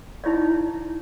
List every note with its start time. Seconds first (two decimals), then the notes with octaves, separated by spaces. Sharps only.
0.24 D#4 E4 C#5 D5